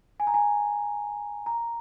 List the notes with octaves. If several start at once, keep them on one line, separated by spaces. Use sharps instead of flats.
G#5
A#5
G#5
A#5